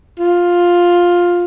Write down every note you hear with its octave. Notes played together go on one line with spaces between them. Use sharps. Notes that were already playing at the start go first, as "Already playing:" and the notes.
F4